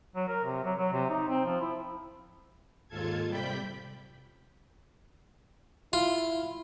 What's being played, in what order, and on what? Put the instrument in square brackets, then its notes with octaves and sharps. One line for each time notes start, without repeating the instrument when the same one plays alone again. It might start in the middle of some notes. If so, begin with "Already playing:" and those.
[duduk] F#3
A#4
C3
F#3
F#3
C3
D#4
C4
F3
E4
[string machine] D#2 G#2 F4 A4 A5 G#6
C3 G3 G5 B5 G6 B6
[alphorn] E4 [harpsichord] F4